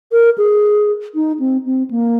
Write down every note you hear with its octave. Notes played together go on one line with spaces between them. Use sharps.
A#4
G#4
D#4
C4
C4
A#3